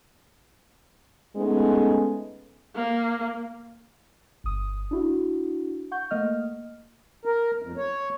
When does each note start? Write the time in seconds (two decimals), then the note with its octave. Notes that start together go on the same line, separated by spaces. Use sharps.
1.36 G#3 A3 B3 C#4 D#4
2.76 A#3
4.44 G1 D#6
4.91 D4 E4 F#4
5.91 F#5 C#6 G6
6.10 A3 A#3 D#5 F6
7.25 A#4
7.62 F2
7.78 C#5